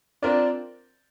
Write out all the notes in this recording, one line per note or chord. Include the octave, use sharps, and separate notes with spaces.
C4 D4 F4 A#4 D5